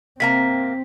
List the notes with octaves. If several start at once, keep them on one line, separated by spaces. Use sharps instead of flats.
C3 A#3 C4 A#5 B6